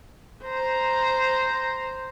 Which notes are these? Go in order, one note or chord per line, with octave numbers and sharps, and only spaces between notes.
C5 A#5